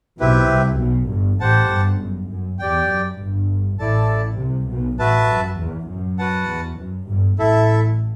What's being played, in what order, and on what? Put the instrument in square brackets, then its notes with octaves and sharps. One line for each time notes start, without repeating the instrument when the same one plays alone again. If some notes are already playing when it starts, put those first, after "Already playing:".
[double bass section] B1 B2 [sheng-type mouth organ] C4 E4 G4 B4 E5
[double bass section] C2 C3
B1 B2
G1 G2
[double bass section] A1 A2 [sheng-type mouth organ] G4 C5 F#5 A5
[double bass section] G1 G2
F#2
F#2
[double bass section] E2 [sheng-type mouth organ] G4 D5 G5
[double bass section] F#2
G1 G2
[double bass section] A1 A2 [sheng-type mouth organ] E4 A4 D5 A5
[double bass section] C2 C3
B1 B2
[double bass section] A1 A2 [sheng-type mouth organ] F#4 B4 E5 A5
[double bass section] F#2
E2
F#2
[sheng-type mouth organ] F#4 B4 F#5 A5
[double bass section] E2
F#2
G1 G2
[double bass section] A1 A2 [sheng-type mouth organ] E4 A4 E5